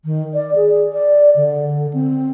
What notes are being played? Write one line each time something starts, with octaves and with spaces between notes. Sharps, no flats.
D#3
D5
G#4
D5
D3
C4